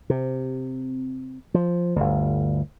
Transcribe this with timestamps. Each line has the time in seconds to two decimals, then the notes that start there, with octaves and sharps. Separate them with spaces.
0.10 C3
1.54 F3
1.96 G1 D2